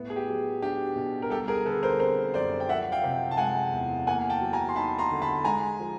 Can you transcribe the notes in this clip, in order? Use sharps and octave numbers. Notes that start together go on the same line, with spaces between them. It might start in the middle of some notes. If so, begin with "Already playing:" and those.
Already playing: A2 B3
G#4
G4
F#3
D4 G4
B2
A#4
G3 G4 A4
G#4 A#4
D3 A4 B4
A#4 C5
C4 A#4 C5
F#2 C5 D5
G5
F3 E5 F#5
F5 G5
C3
A5
G#3 F#5 G#5
E2
A#3 F#5 G#5
G5 A5
F#3
G#5 A#5
C6
D#4 A5 B5
A#5 C6
D3
A5 B5
G#3 G#5 A#5
F3